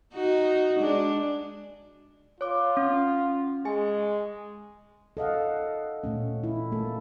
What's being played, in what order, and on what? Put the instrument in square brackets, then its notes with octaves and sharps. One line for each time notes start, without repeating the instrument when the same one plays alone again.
[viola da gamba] D#4 F#4
G#3 D4
[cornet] F4 [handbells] C#5 D6
[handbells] C#4
[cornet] G#3 [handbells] G#4 G#5
[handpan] A4 D#5 F5 F#5
A#2 A3 C#4
E4
A3 A#3 A4